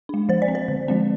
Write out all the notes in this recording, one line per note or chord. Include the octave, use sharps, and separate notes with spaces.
G#3 D4
F3 C5
D5
C4
C5
D3
F3 G#3 C4